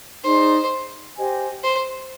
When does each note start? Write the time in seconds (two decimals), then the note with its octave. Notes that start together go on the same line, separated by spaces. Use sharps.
0.23 D#4 G#4 C5 D5
1.16 G4 C5 D#5 G#5
1.63 C5